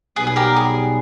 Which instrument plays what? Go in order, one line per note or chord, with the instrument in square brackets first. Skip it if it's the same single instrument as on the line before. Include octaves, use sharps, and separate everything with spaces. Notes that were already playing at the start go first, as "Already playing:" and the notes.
[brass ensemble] B1 B2 G3 B3 [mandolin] G#4 B4
[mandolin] G#4
G4 A#4
G#4